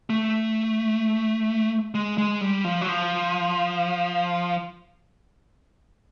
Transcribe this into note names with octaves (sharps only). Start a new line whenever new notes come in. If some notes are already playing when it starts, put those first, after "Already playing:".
A3
G#3
G#3
G3
F3
F#3
F3